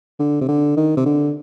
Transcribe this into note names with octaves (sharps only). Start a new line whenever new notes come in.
D3
C3
D3
D#3
C3
D3